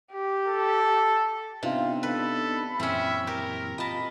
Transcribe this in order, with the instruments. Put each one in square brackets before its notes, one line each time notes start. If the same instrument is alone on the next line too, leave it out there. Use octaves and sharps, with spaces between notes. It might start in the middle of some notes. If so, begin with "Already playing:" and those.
[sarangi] G4
[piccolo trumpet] A4
[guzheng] C3 [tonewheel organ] B3 D4 D#4 [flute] F4
[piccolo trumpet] A4 [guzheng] B4 [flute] B5
[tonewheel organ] F#2 A#2 E3 [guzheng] C4 C#4 [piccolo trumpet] E5
[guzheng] G4 [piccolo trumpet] A#4
[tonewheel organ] F4 [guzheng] D#5 A5 [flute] B5